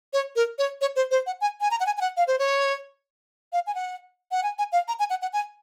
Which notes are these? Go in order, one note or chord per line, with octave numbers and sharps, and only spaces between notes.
C#5
A#4
C#5
C#5
C5
C5
F#5
G#5
G#5
A#5
F#5
G#5
G#5
F#5
F5
C5
C#5
F5
G#5
F#5
F#5
G#5
G#5
F5
A#5
G#5
F#5
F#5
G#5